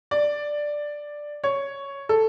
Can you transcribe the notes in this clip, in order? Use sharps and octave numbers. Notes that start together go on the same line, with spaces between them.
D5
C#5
A4